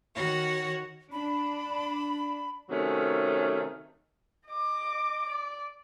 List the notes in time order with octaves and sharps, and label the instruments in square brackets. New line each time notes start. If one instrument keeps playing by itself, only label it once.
[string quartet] D#3 F#4 C#5 F#5 A#6
[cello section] D4 [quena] B5
[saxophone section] C3 D#3 F#3 A3 C#4
[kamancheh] D#5 D6
D5